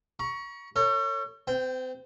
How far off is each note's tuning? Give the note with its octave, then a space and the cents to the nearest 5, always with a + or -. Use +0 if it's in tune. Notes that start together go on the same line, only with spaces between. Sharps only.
A#5 +45 C#6 +10
A4 +45 C#5 +0
C4 -35 G5 +0